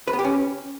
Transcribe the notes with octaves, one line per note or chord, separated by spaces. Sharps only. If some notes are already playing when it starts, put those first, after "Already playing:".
B4
B3
G4
C#4